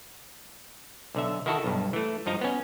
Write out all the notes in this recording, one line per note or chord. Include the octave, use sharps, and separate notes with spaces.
B1 D3 E5
D#3 E4 F#4 A4
B1 G2
E3 A3
G2 F3 D#4 A#5
B3 C#4